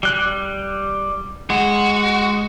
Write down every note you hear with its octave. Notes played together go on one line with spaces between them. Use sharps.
G3 F#6
G#3 F#4